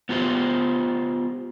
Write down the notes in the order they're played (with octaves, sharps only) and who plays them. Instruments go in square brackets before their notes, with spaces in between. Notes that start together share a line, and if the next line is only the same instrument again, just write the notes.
[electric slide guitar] B3 F4 G4 C5